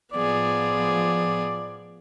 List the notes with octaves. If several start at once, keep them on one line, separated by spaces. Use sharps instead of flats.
A2 F3 B3 G#4 D5